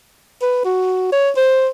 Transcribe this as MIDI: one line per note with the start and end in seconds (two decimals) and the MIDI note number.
0.42 0.62 71
0.65 1.12 66
1.12 1.31 73
1.37 1.68 72